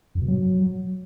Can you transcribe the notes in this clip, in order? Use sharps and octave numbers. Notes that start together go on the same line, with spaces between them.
F#2
B2
F#3